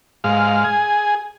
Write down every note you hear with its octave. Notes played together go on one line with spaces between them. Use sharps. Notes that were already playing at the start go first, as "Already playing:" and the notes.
G#2 F5
G#4